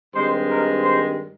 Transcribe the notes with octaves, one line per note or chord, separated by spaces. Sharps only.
G2 D#3 G#3 C4 C5
A#4
C5